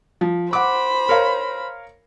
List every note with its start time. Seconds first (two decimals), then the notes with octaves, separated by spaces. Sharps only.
0.21 F3
0.53 C5 F#5 B5 D6
1.09 A#4 C#5 F5